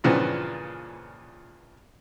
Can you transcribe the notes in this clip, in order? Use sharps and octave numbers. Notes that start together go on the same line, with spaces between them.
G2 A#2 C#3 E3 F3 B3